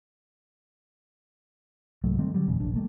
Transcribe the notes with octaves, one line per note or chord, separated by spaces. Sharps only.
C2 G#2 F#3 A3
D#3 G3 A3 C4
D3 F#3 G3
F1 E2 A#2 C#3
F1 A#1 D4
G3 A3 A#3